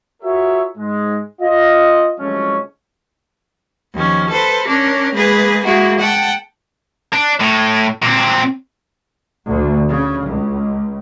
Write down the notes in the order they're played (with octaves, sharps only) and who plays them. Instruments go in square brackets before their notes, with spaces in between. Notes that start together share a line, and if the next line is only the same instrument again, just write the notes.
[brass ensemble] F4 F#4 G#4 A#4 C#5 E5
G#2 G#3
F4 D#5
F#1 C2 F3 G#3 A3 C#4
[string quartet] D#2 F3 C#4
A4 B4 C5
C#4 D4 A#4
G#3 A#3 G#4 B4
G#3 A#3 E4 F#4 G#4
F#5 G5 A5
[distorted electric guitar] D4
A2
A#2 C4
[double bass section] D2
C#3
C#2